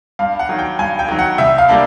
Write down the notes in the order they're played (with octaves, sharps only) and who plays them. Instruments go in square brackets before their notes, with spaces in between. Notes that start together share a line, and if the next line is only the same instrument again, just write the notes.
[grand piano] G2 F5
F#5
D#3 F#3
G5
G2 G#5
G5
D#3 F#3
F#5
C2 E5
F5
G3 A#3 D4